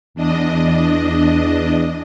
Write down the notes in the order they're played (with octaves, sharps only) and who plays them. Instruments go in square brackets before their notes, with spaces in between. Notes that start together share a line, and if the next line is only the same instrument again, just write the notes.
[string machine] E2 D4 D#5